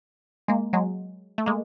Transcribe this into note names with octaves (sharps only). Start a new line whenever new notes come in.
G#3 A#3
F#3 G#3
A3
G#3 A#3